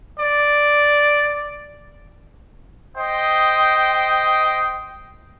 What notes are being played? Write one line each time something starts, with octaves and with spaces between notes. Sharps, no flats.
D5
C5 D#5 G5